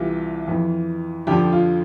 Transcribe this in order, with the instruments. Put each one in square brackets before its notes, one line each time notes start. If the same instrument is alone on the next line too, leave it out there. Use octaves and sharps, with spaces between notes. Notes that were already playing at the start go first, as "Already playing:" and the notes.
Already playing: [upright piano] C2 C3 E3 F4
F2 E3
F2 D3 F3 G4
F4